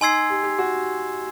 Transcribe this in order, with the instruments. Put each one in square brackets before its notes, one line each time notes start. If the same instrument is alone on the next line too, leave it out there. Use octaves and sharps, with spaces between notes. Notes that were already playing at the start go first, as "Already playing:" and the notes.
[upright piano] D#4 [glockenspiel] G#5 C6 E6 G#6 C7
[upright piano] G4
G4
F#4